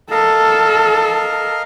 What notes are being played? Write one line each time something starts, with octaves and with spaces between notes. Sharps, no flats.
A4 A#4 D#5 F5